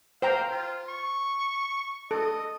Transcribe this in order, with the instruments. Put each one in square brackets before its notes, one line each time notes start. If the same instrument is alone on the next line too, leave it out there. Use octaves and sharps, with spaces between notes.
[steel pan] C5 G5 A#5 [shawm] F5
[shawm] F4
C#6
[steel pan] A4 [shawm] D#5